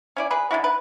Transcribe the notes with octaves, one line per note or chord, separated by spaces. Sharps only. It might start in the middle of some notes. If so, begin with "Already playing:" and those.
C#4 E4 D5
G#4 B4
D3 G#3 E4 F#4
B4